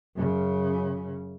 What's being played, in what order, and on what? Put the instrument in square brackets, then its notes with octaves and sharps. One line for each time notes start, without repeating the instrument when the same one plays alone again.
[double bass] F#2 C#3